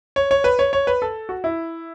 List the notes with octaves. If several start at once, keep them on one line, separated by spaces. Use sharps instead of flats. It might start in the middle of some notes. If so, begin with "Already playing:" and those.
C#5
C#5
B4
C#5
C#5
B4
A4
F#4
E4